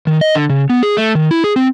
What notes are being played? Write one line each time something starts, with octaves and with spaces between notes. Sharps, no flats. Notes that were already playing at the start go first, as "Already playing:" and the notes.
D#3
D#5
D3
C#3
B3
G#4
A3
D#3
E4
G#4
C4